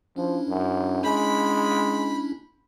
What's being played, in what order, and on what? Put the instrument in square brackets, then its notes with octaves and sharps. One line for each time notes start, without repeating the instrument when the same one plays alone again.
[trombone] F3 [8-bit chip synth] C#4 D4 E4
[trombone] F#2
[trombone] G#3 [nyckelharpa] B5